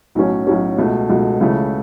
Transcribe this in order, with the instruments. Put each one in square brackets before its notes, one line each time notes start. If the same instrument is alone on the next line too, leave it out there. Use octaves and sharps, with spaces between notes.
[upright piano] B1 A2 F#3 C#4
B1 A2 F#3 C#4
C#2 B2 A3
C#2 B2 A3
C#2 C#3 E3 A3